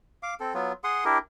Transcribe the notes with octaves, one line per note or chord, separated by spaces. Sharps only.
F5 D6
C4 A4
F#3 B3 F4
G#4 F#5 C6 D#6
D4 E4 G4 A#4